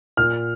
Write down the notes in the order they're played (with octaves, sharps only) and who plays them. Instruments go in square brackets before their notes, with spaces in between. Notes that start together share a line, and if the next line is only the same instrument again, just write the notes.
[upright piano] A#2 [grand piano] F6